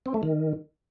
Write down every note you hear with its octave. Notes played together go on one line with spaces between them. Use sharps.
C4
A3
D#3